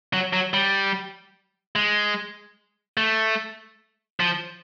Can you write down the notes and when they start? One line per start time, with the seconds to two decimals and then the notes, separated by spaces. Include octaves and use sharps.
0.13 F#3
0.33 F#3
0.54 G3
1.76 G#3
2.97 A3
4.20 F3